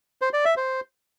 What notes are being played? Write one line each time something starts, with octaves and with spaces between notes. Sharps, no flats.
C5
D5
E5
C5